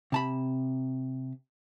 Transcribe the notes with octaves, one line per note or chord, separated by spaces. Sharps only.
C3 A5 B5